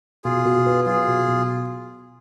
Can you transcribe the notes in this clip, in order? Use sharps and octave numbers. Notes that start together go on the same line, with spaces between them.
B2 F4 G#4
B2
B3
F#3 F4 G#4
B2
B2